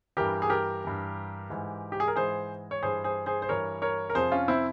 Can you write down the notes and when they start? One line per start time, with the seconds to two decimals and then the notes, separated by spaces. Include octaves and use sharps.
0.17 G2 E3 G4 A#4
0.42 G#4
0.50 G4 A#4
0.84 G2 E3
1.50 G#2 E3
1.92 G4
2.00 G#4
2.08 A#4
2.16 G#2 E3 G#4 C5
2.71 C#5
2.83 G2 E3 G#4 C5
3.04 G#4 C5
3.26 G#4 C5
3.42 C5
3.49 G2 E3 A#4 C#5
3.82 A#4 C#5
4.10 A#4
4.15 F2 C3 F3 G#4 C5
4.32 C#4 F4
4.48 C4 E4